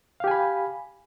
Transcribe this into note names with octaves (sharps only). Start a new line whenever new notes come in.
G4 F5 G#5 B5